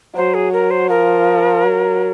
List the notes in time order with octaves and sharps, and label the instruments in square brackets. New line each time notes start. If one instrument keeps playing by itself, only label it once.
[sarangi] F#3 [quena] C5
[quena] G#4
A#4
C5
[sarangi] F3 [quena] A#4
[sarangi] F#3